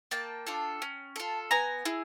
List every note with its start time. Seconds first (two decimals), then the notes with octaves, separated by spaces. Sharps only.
0.11 A#3 G5 A5
0.47 D4 F4 A4
0.82 C#4
1.16 F4 A4
1.51 B3 G#5 A#5
1.85 E4 G#4